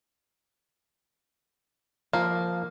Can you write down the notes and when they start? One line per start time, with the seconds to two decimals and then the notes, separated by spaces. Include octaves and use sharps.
2.13 F3 A#3